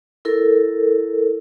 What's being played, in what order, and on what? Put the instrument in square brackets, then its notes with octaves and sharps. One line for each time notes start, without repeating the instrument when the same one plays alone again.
[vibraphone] E4 A4 A#4